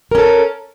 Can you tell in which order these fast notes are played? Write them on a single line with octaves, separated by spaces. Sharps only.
A#4 C#4 A4